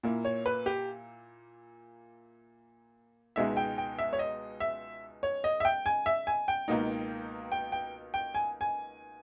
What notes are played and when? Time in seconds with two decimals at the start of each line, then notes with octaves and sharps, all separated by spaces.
0.03 A#2 A#3 E4
0.25 C#5
0.46 B4
0.66 G4
3.36 C#2 B2 G#3 D#4 E5
3.57 G5
3.78 G5
3.99 E5
4.13 C#5
4.19 D#5
4.60 E5
5.23 C#5
5.44 D#5
5.60 E5
5.65 G5
5.86 G#5
6.06 E5
6.27 G#5
6.48 G5
6.68 C#2 B2 A#3 D#4
7.52 G5
7.72 G5
8.14 G5
8.34 G#5
8.61 G#5